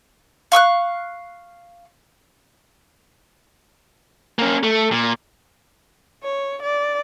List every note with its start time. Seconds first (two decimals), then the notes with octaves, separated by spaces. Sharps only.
0.52 F5 C#6 E6 F#6
4.39 A#3 C#4
4.63 A3
4.92 A#2
6.23 C#5
6.63 D5